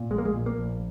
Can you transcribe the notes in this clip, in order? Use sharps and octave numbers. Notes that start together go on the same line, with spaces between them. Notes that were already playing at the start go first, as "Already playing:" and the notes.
Already playing: A#2
A#1 G#3
A#3
G#3
A#2
A#3
A#1